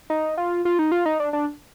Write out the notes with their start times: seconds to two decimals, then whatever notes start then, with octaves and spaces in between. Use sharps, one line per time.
0.10 D#4
0.38 F4
0.65 F4
0.79 D#4
0.92 F4
1.06 D#4
1.20 D4
1.33 D4